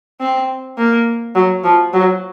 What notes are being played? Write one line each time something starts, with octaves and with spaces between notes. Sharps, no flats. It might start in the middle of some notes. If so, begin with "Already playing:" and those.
C4
A#3
F#3
F3
F#3